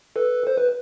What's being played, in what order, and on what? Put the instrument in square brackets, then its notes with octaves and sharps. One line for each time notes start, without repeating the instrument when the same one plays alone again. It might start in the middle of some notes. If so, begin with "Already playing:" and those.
[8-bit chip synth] A4 B4
C5
B4